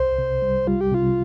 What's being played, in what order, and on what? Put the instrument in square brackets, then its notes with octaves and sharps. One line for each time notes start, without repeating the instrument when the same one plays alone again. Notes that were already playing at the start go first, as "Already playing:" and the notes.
Already playing: [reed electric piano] C2 [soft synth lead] C5
[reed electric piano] C3
G3
[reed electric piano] G3 [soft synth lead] F4
[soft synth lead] G4
[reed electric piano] C3 [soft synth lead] F4